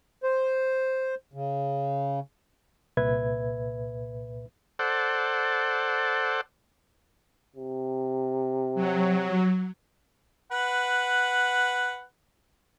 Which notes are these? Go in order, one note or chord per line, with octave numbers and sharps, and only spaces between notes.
C5
C#3
C2 A#2 B4 E5 G#6
A4 C5 D5 F#5
C3
F#3
B4 F#5